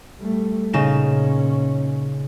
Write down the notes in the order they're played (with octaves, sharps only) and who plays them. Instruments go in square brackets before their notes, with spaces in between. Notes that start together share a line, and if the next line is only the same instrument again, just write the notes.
[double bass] G3 A3
[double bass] A#2 C#4 [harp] C#3 D#4 E7